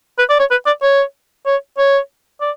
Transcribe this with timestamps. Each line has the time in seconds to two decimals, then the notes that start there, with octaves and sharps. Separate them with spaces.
0.19 B4
0.30 D5
0.39 C#5
0.51 B4
0.67 D5
0.82 C#5
1.46 C#5
1.78 C#5
2.41 D5